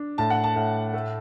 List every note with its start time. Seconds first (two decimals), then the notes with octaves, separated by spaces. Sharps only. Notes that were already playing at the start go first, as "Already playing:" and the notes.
Already playing: D4
0.18 A2 A5
0.30 F#5
0.44 A5
0.56 A2
0.94 A3